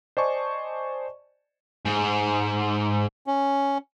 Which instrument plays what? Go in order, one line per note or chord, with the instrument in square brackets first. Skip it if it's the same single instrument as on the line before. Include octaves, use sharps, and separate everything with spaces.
[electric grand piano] C5 D5 D#5 G#5 A5 C#6
[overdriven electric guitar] G#2
[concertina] C#4